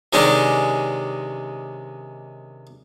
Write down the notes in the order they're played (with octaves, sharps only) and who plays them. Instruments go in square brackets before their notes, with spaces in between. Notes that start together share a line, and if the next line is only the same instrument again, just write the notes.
[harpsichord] C3 D#3 G#3 C#4 D4 G4